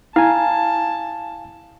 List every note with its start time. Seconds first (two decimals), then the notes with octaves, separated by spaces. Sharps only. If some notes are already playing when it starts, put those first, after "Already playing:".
0.16 E4 F5 G#5 A5